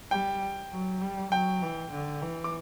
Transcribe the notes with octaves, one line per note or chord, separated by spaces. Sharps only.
G3 G5
F#3
G3
F#3 G5
E3
D3
E3
D6